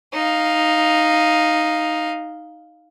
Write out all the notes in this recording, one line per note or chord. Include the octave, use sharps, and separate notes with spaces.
D#4 F5